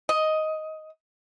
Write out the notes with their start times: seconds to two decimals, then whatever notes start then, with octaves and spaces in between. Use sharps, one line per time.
0.09 D#5